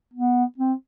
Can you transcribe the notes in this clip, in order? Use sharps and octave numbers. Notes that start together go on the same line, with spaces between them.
B3
C4